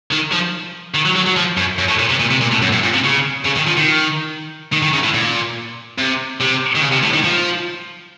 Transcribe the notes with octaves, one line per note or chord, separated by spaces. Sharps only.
D#3
F3
D#3
F#3
F#3
F#3
F3
F#2
F#2
A2
A#2
C3
A#2
C3
A#2
A2
F#2
A2
A#2
C3
C#3
C#3
D#3
F3
D#3
D#3
D#3
C#3
A2
A#2
C3
C3
D#3
C#3
C3
A2
D#3
F3